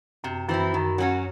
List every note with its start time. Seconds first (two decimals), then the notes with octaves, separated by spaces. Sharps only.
0.24 F#2 C3
0.49 F#2 E3 C4 E4
0.74 F#2 D#3
0.98 F#3 C#4 F#4